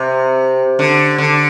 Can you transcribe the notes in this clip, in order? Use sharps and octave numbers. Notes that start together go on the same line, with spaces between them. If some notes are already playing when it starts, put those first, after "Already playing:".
Already playing: C3
D3
D3